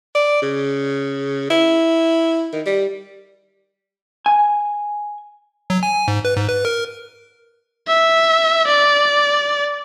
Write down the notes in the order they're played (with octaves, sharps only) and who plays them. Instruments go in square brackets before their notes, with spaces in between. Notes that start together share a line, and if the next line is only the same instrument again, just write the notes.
[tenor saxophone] D5
C#3
E4
D#3
G3
[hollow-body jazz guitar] G#5
[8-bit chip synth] F#3
G#5
G#2
B4
G#2
B4
A#4
[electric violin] E5
D5